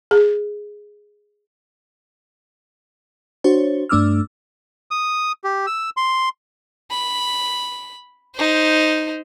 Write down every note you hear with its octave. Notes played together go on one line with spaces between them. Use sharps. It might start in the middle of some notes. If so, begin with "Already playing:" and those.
G#4
D4 F#4 C5 C#5
G2 A3 D4 D6 E6 F6
D#6
G4
E6
C6
B5
D#4 C5